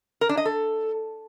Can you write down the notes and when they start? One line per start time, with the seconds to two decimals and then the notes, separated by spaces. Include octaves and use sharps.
0.21 A#4
0.29 D4
0.37 D#5
0.45 A4